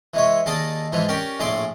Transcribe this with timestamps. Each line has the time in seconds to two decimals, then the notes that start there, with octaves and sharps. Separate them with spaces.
0.14 E3 G#3 C#5
0.46 D#2 G#4 D5 D#5 A5
0.92 G#2 E3 F3 G#3
1.08 C#4 G4 A#4 D5
1.40 A#1 A2 G#4 D5 C6 D6